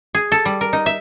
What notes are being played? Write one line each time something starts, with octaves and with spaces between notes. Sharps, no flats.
G#4
A4
G3
A#4
D#4
E5